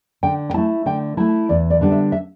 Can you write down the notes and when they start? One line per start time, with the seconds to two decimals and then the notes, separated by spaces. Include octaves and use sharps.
0.23 D3 G5
0.50 G5
0.54 A3 E4 A5
0.86 D3 G5
1.17 A3 E4 A5
1.49 E2 D5
1.70 D5
1.81 D3 G3 B3 D4
1.92 E5
2.12 E5